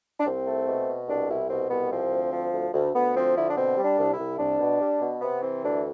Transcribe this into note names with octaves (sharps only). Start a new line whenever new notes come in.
D4
C2 C4
A3
B2
B2
C2 D4
C2 E4
B2 C4
C2 B3
F3 C4
D2
F3
D2
D2
D2 B3
F3 C4
D3 E4
D4
B2 C4
G3
D4
C2
E4
C2
C2 D4
B2
G3
B2
C3 B3
E3 C4
D2 D4